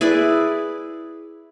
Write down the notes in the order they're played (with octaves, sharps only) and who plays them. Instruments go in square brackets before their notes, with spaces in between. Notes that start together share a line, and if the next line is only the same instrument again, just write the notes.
[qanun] E4 G#4 B4 D5